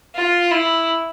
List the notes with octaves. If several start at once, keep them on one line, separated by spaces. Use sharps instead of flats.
F4
E4